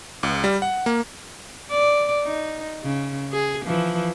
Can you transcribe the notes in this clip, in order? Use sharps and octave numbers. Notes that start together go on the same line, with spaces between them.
C#2
G3
F#5
A#3
D5
D#4
C#3
G#4
E3 F3